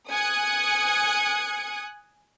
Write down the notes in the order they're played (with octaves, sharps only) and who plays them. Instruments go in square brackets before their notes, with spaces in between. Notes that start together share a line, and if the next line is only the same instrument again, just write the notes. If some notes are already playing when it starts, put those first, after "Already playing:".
[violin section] G#5 D#6 F#6 G#6 C#7